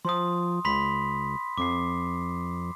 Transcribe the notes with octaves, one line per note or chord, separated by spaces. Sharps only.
F3 C6 D#6
C#2 B5 C6 B6
F2 D6 C7